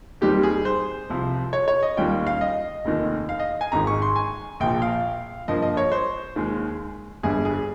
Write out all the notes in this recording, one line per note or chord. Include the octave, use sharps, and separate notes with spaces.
D#2 D#3 G3 C4 D#4 G4
G#4
C5
C2 C3 F3
C#5
C#5
D#5
D#2 D#3 G3 C#4 F4 G5
F5
D#5
F1 D#2 D#3
F5
D#5
G#5
G#1 G#2 D#3 A#5
C#6
C6
G#5
A#1 A#2 F3 G5
F5
G2 F3 A#3 D#5
D#5
C#5
C5
D#2 D#3 G#3
G1 G2 G3 G#4
G#4